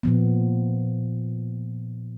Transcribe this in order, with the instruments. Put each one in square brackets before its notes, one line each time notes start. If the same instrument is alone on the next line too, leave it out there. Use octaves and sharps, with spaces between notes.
[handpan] A#2 F3 B3